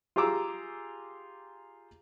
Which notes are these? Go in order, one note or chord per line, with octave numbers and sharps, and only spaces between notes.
F4 G4 G#4 A#5 D6 E6